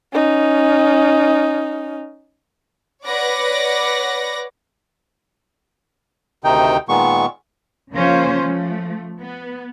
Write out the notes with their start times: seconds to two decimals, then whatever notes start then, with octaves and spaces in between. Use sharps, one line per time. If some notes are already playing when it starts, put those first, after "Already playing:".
0.14 C#4 D#4
3.05 B4 C#5 D5 F#5 D6 A#6
6.44 D2 C3 D#3 D#4 G5
6.89 A#2 D#3 G#3 B3 C#6
7.93 C#3 F3 A#3 C#4 F4 C5
8.43 F3 A3
9.20 B3